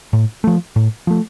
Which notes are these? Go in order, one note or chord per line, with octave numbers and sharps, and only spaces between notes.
A2
F3 A3
A2
F3 A3